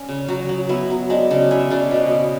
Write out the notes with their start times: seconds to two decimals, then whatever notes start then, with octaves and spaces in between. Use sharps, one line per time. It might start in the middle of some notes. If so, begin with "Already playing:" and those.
Already playing: C#4 D5
0.08 C#3
0.28 F#3 F#4
0.49 F#3
0.69 B3 E4
0.90 F#3
1.10 G#3 D4
1.30 C#3 D4
1.51 C#4 E4
1.70 C#3 D4
1.91 B2
2.12 B2